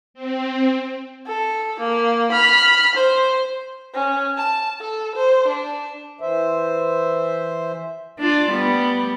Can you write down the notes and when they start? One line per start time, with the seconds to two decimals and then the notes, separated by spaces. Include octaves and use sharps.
0.14 C4
1.26 A4
1.80 A#3
2.32 B5 F6
2.95 C5
3.94 C#4
4.37 A5
4.80 A4
5.15 C5
5.48 D4
6.21 E3 C5 E5
8.19 D4 F4
8.50 G3 B3